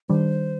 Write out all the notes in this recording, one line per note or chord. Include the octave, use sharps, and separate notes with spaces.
D#3 G3 D4 C5